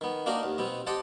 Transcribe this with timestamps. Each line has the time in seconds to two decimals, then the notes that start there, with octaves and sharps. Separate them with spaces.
0.01 D#3 B3
0.26 A#3 D4 D#4 F#4 D#5 F5
0.43 D#2
0.58 B2 B3 C4
0.87 G4 C5 D#5 F#5 G5 A5